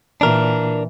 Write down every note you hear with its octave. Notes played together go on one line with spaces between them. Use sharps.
A#2 E3 D4 A#4